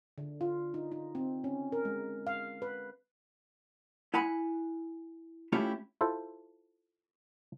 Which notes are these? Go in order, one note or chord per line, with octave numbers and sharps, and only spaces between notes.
D3
F4
D#4
D#4
C4
C#4
A#4
G#3
F5
B4
E4 F#5 G#5 B5
A3 C#4 E4 F4 G4
E4 F4 A4 C5